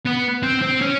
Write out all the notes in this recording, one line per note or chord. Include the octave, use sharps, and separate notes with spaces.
B3
C4
C4
C#4